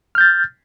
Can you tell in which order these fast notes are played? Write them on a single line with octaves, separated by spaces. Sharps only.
F6 G6 A6